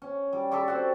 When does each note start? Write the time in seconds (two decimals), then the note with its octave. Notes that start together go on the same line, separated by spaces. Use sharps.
0.02 C#4
0.33 G3
0.51 A4 B5 C#6 D6
0.68 C4 F#4